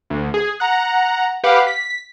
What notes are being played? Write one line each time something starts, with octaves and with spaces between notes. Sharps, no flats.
D2
G#4
F#5 A#5
G4 B4 F5 F#5 D6
B6